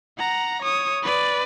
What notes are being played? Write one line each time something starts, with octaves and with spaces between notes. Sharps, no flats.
F#5 A#5
C#5 D#6
B4 D5